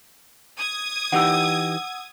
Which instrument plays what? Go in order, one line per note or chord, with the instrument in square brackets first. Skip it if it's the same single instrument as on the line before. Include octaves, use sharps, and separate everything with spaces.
[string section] D#6 G#6
[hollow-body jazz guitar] E3 D#4 G4 [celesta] F#5 E6